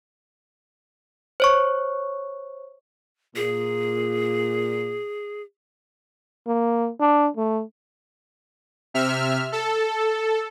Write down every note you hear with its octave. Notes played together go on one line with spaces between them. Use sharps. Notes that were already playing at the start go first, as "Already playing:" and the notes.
C5 C#5 C#6
A#2 G#4
A#3
D4
A3
C3 E5 F6
A4